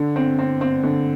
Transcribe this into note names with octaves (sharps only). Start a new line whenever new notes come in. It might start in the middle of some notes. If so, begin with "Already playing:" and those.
Already playing: D3
C4
C4
C4
D3